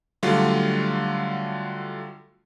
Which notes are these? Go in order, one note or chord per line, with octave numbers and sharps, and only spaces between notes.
D3 F#3 G3 A3 F4